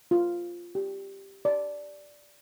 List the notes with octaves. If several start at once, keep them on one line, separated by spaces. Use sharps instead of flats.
F4
G4
D5